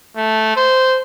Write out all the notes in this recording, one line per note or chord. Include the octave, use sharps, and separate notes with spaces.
A3
C5